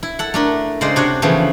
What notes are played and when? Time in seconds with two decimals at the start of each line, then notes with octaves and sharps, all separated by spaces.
0.03 E4
0.19 A4 F#5
0.34 A3 D4 A#4
0.81 C#3 G#3 C5 D5 D#5
0.96 C3 D4 F#4 C#5
1.22 C#3 E3 F3 A3 B3 C4